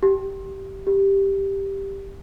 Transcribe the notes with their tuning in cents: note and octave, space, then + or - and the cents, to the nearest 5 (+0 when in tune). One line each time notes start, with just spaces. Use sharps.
G4 -15
G4 +0